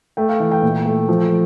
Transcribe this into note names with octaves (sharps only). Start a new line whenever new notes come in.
A3 G5
F5
E3
G5
A#2
A3
F3